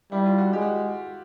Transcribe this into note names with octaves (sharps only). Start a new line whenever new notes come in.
G3 E4
F4
F#4
G#3 G4
F#4